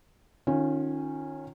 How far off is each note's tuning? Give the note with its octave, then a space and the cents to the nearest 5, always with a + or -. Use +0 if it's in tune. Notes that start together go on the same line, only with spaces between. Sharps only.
D#3 -30 C#4 -15 F4 +0